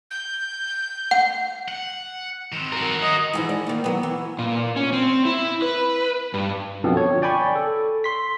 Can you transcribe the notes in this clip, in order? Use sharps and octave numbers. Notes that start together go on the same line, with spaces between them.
G6
F#5
F#5
D#3 C4
F#4 A#4
C#5 D#5 F#5
G#2 E3 F3
D5
D#3 A#3
F#3 B3
E3
A#2
C#4
C4
E4
B4
G2
F#2 B2 D3 F3 B3 C4
C#5
D5 G5 G#5 B5 C#6
A4
C6 B6